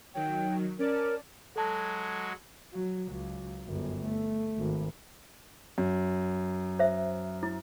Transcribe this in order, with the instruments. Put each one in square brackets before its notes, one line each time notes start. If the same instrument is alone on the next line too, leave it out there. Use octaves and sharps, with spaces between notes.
[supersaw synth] D#3 F#3 [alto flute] G5
[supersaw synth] C#4 D5 A5 [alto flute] A#4
[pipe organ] F#3 G#3 F#4 [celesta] A4 A5
[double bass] F#3
C#2 F#3
G1 F#2
A3
G#1
[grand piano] F#2
[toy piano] C5 E5
E4